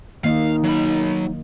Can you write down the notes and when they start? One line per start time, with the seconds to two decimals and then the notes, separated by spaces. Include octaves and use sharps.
0.24 D#3 A#3 D#4 D#5 F5
0.63 F#3 B5